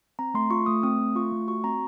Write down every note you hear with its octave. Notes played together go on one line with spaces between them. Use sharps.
C4 A#5
A3 C6
F4 C#6
A3 D#6
C4 D#6
A3
F4 C#6
A3
F#4 C#6
C4 A#5